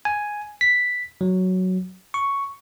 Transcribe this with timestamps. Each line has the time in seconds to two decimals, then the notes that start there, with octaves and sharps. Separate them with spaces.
0.05 G#5
0.61 B6
1.21 F#3
2.14 C#6